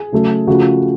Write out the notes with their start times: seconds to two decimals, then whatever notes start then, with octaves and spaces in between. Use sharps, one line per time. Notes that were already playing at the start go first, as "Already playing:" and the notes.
Already playing: G#4
0.12 C#3 F#3 A3
0.47 C#3 F3 A3 F#4